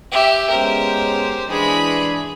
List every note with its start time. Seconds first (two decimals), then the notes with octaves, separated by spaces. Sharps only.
0.12 G4 E5
0.50 G#3 B3 C#4 G4 A#4 C5
1.50 E3 G#3 D4 G#4 B5